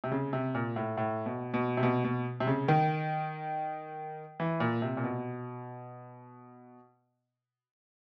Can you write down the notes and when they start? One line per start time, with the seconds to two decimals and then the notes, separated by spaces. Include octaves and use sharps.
0.04 C3
0.12 C#3
0.33 C3
0.55 A#2
0.76 A2
0.97 A2
1.26 B2
1.54 B2
1.77 C3
1.83 B2
2.04 B2
2.40 C3
2.47 C#3
2.68 D#3
4.40 E3
4.60 A#2
4.82 C3
4.97 A#2
5.04 B2